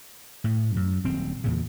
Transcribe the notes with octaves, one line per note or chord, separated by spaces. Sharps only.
A2
F#2
D#1 C4
E2 A#2 C#3